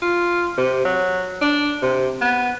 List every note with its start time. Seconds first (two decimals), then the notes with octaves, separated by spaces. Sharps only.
0.02 F4
0.58 C3
0.85 F#3
1.42 D4
1.82 C3
2.22 B3